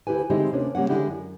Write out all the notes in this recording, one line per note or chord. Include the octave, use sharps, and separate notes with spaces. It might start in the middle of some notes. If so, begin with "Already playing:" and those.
D2 E4 G4 B4 G#5
D3 G#3 C4 D#4 E4 G4
D2 C3 A#3 C#4 D4
C#3 G3 A#3 C#4 F#5
D3 G#3 C4 D4 E4 G4
F#2